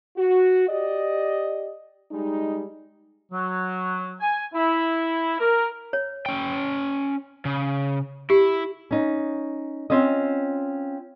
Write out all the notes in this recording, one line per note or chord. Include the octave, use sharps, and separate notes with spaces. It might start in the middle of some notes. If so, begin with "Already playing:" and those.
F#4
G4 D5 D#5
G3 G#3 D#4
F#3
G#5
E4
A#4
C#5
C#4 G5
C#3
E4 G4
C#4 D#4
C4 C#4 F4 D#5